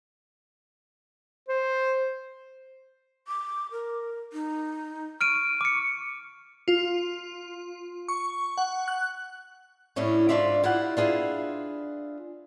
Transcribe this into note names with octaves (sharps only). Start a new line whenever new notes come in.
C5
D6
A#4
D#4
C#6 F6 D7 D#7
D6 C#7
F4
C#6
F#5
F#6
A2 G3 C#4 D4 E4
G#2 D4 F4 D5 E5
E4 F4 G4 F#5
D4 F4 G#4 B4 E5